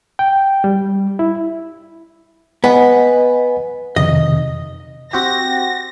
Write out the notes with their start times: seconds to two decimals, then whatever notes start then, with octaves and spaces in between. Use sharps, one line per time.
0.19 G5
0.64 G3
1.19 E4
2.64 B3 D#5 F#5 G#5
3.96 F2 C3 D#3 D#5
5.13 C4 F#4 G4 A#6